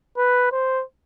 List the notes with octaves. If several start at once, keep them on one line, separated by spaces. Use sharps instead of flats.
B4
C5